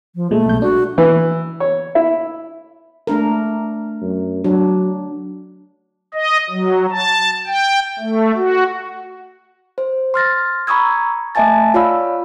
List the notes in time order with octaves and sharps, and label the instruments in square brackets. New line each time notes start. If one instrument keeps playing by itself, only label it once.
[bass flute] F3
[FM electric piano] A#2 G#3 [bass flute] A3
[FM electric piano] B1 G6
[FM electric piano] D4 [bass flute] F#4
[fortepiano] E3
C#5
E4
[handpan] A3 D4 A#4
[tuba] F#2
[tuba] F#3 [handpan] D4
[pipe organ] D#5
F#3
A5
G5
A3
F#4
[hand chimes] C5
C6 F6 A6 A#6
A#5 B5 C#6 D#6 E6 G#6
A3 D#5 E5 G#5 A5 A6
F4 C#5 D5 F5 B5 E6